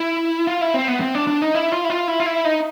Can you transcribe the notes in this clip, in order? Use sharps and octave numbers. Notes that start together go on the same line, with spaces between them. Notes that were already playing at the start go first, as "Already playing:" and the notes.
Already playing: E4
F4
E4
C4
B3
C4
D4
D4
D#4
E4
F4
E4
F4
E4
F4
E4
D#4